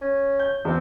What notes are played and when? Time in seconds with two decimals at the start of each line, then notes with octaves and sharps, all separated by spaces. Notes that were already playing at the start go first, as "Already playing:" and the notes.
0.01 C#4
0.40 G6
0.65 E2 C4